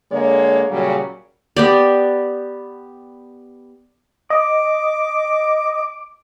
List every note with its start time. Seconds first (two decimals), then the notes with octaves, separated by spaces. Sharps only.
0.12 D3 G#3 A#3 C#5
0.71 A#2 C#3 F#3 G3 C#5
1.57 B3 G4 D5
4.30 D#5 D6